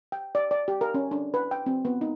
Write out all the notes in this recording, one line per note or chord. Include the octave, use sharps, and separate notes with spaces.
G5
D5
D5
G4
A#4
C#4
D4
B4
G5
C4
B3
D#4